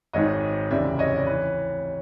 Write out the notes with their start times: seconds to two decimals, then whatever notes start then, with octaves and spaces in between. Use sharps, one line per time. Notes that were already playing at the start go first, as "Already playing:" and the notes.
0.13 G#1 G#2 D#3 C#5 D#5
0.70 F1 D#2 C#3 E3 D5 E5
0.99 C#5 D#5
1.16 D5
1.27 E3 B4 C#5